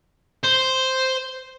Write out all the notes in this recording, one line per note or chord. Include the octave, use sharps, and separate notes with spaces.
C5